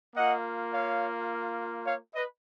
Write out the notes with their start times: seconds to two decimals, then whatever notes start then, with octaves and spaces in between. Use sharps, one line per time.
0.16 A#3 F4 D#5 F#5
0.73 C#5 F5
1.87 C#5 F5
2.15 B4 D#5